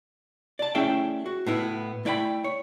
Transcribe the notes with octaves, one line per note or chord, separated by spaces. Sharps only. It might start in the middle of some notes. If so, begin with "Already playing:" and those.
D5 A5
A3 C#4 E4 G#4 E5 G5
F#4
A2 B3 E4
A3 E4 D5 G5 G#5 B5
C#5